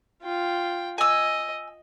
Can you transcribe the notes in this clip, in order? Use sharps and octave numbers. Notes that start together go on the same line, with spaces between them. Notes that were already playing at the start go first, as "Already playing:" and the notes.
F4 G5
D#5 G#5 E6